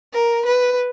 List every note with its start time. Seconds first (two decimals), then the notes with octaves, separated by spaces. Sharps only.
0.13 A#4
0.46 B4